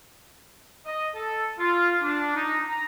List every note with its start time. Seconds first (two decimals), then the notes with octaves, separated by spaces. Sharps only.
0.86 D#5
1.15 A4
1.59 F4
2.02 D4
2.35 D#4
2.68 A#5